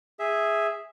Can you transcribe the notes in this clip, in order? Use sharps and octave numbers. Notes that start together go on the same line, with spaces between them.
G#4 E5